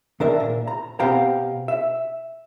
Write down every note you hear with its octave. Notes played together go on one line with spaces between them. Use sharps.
D#3 D4 A#4 E5
A#2
A#5
B2 C4 G4 F5 G5 A#5
E5